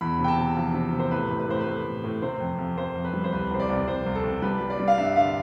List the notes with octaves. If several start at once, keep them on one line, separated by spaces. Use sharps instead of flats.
E2 B5
C3
G5
A5
C3
F3
C3
C3
C5
A2 B4
A2
B4
A2 C5
B4
A2
A2
A2
C3 C5
F2
F2
F2 C5
F2
B4
G3
C5
C2 B4
C2 C5
D5
C2
C2 C5
C2
A4
C2
G3 B4
G3
D5
G3
F5
G2 E5
D3 F5